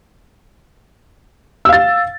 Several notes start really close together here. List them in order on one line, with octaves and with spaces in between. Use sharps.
E6 F5 A6